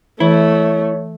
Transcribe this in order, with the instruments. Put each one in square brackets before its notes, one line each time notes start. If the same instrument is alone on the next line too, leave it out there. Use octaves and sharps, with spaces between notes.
[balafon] E3 [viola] A3 [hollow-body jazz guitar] E4 [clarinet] C#5